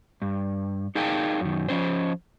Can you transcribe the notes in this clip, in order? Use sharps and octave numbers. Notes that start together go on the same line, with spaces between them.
G2
D#4 G#4 A#4 F5 G5 A5
F#2 D#3
F3 C#4 C5